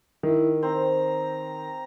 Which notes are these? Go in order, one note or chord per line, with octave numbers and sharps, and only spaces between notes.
D#3 E4
C4 C5 A#5